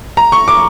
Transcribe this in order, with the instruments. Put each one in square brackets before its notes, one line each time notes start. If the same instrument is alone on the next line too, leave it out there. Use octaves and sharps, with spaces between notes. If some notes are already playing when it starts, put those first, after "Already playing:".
[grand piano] A#5
C#6
D6